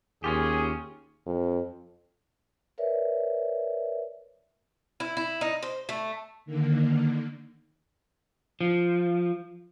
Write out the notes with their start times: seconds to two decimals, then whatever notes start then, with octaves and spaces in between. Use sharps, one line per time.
0.24 D#2 C#4 F4 G4 G#4
1.26 F2
2.78 A#4 B4 C#5 D5 E5
5.00 E4
5.17 E4
5.41 D#4
5.63 C5
5.89 A3
6.46 D3 D#3 A#3
8.61 F3